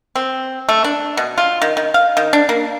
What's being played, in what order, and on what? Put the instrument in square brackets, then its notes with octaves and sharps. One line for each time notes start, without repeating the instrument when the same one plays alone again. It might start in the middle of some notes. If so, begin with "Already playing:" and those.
[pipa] C4
A3
D4
B2
F4
D#3
D#3
F5
D#3
D4
A#3